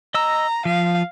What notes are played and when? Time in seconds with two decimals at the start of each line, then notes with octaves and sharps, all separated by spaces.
0.14 D#5 A#5 E6
0.65 F3 F5